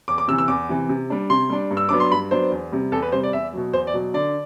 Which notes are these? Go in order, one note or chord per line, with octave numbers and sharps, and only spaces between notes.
E2 D6
D6
C3 E3 E6
E6
E2 D6
C3 E3
C3
G3 D4
C3 C6
G3 D4
G2
E6
F#3 B3 D4 D6
C6
G2 B5
F#3 B3 D4 C5
E2
C3 G3
E2 A4
B4
C3 G3 C5
D5
E2 E5
B2 F#3
E2 C5
D5
B2 F#3
D3 D5